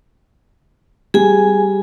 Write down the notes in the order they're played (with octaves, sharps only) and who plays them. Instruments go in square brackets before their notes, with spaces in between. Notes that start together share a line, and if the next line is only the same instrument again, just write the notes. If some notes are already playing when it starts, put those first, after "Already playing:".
[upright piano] G3 [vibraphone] G#4 G#5